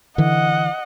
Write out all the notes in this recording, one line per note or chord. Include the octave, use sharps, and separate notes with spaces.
D3 E3 D#5 F#5